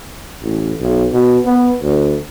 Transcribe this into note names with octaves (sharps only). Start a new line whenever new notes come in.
A1
B1
B2
B3
D2